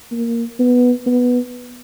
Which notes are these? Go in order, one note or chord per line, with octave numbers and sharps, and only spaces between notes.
A#3
B3
B3